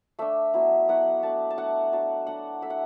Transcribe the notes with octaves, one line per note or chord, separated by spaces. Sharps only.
A3 D4 E5
F#3 B3 E4
F#3 B3 E4 F#5
A3 D4 A5
A5
A3 D4 F#5
F#3 D4 A5
F#3 D4 F#5
A3 D4 E5
F#5